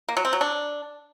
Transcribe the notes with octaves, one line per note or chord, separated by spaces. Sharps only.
A#3
F#3
C4
F#3
D4